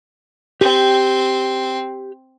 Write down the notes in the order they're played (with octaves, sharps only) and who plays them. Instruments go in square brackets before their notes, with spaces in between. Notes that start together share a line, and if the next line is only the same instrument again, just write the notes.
[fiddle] C4 [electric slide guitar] G4 G5